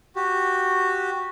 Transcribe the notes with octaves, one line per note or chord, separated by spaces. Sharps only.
F#4 G4